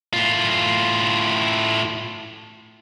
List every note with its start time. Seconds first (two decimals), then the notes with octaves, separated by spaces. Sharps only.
0.13 A2 F4